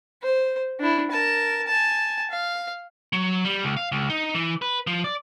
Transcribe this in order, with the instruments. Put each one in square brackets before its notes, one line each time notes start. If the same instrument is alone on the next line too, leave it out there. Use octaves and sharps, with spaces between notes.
[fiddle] C5
D4 E4
A#4 A5
G#5 A5
F5
[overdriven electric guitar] F#3
G3
C#2
F5
C#2
D#4
E3
B4
F3
D5